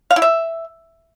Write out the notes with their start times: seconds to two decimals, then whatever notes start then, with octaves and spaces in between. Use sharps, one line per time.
0.11 F5
0.16 E4
0.22 E5